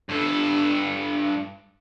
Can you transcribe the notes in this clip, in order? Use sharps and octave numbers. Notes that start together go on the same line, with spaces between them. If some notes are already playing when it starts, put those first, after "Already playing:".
G2 A4